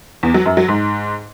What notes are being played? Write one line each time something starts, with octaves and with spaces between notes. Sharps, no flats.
E2
F#3
F#2
F#3
G#2